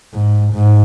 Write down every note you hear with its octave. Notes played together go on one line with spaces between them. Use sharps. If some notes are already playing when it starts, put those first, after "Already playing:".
G#2
G#2